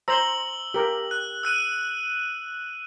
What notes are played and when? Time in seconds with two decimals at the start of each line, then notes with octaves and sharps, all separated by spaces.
0.08 C5 A#5 E6 F#7 G7
0.74 G4 A#4
1.11 F#6
1.43 E6 F#6 D#7